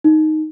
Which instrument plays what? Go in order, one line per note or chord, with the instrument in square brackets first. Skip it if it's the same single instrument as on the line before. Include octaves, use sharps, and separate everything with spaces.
[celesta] D#4